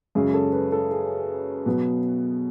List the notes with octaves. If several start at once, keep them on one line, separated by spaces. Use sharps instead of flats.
F#2 C#3 G#3 C#4 G#4
A4
B4
A4
G#4
B2 F#3 B3